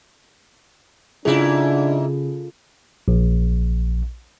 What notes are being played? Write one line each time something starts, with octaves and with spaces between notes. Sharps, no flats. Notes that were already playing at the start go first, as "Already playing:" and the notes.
G#2 C#3 C#4 D4 E4 F4 G#4 A4
A#1